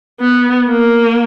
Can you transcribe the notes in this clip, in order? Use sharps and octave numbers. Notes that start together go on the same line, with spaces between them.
B3
A#3